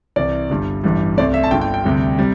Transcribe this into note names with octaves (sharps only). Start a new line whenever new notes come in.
C2 C3 E3 D5
G1 G2 G3
A1 G2 E3 G3
C2 C3 A3 D5
E5
A5
G1 G2 D3 G5
G5
G5
D2 C3 G3
C3 G3